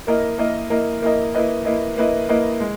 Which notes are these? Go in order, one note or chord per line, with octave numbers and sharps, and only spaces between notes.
A#3 E4 A#4 D#5
A#3 E4 A#4 D#5
A#3 E4 A#4 D#5
A#3 E4 A#4 D#5
A#3 E4 B4 D#5
A#3 E4 B4 D#5
A#3 E4 B4 D#5
A#3 E4 B4 D#5
G#3